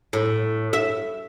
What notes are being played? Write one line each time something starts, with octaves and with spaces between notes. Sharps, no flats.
A2
E5